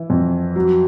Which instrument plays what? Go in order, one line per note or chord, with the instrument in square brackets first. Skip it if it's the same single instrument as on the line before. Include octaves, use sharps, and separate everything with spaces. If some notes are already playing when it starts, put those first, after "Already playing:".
Already playing: [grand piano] E3
F2
F#3